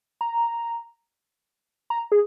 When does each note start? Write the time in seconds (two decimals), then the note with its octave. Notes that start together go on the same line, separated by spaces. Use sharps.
0.21 A#5
1.90 A#5
2.12 G#4